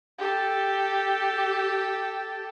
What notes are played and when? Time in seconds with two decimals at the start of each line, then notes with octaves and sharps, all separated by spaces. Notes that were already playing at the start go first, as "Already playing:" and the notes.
0.19 G4 A4